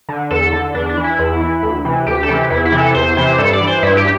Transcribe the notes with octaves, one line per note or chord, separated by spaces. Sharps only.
D3
E2 A4
D3
E2 D4
D4
E3
E4
E2
E3
D2
C3 E3
D2 G4
A4
C3 E3 G4
E2 E4
E4
C3 E3
A4
E2 C5
C3 E3 C5
G2 A4
D5
E3
C5
G2 E4
G4